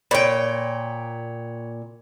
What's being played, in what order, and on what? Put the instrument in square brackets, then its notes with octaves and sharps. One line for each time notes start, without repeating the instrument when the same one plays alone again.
[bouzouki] A#2 G5 [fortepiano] C#5 B5